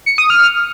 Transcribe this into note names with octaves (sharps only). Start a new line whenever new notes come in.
C#7
D#6
F6